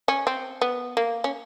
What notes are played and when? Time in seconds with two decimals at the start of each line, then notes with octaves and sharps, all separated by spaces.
0.08 C#4
0.27 C4
0.62 B3
0.97 A#3
1.24 C#4